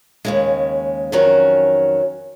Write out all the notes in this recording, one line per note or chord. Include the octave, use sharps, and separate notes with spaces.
D#2 C#3 G#3
F2 D#3 F#3 C#4